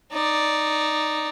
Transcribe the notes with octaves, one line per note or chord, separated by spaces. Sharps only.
D#4 D5